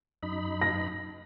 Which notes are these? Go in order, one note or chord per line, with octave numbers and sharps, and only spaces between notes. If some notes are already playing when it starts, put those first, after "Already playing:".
F#2 D#4 B5
A#6